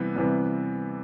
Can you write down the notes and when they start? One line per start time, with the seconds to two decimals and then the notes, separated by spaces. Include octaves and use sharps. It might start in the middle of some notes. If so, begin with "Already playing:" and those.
Already playing: C3 E3 G3 B3
0.15 C3 E3 G3 B3